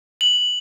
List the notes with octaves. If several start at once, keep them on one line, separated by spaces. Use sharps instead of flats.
F#7